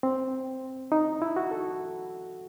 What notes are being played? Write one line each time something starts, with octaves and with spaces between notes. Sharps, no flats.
C4
D#4
E4
F#4
A4